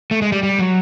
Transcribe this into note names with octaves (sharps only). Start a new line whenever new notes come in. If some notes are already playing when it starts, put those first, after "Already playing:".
A3
G#3
G3
G3
F#3